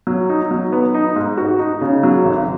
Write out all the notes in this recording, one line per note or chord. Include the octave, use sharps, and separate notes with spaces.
F#3
D#4
F#3
B3
D#4
G#2
F#4
D#4
C#3
F#3
G#1